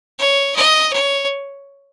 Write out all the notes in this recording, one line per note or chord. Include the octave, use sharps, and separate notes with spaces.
C#5
D#5
C#5